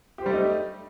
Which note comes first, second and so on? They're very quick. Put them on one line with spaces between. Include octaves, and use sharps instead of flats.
G4 C5 G3 A3 D#4